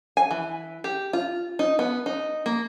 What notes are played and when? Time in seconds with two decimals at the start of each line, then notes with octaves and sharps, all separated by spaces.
0.17 G#5
0.31 E3
0.84 G4
1.13 F4
1.59 D#4
1.79 B3
2.06 D#4
2.46 A#3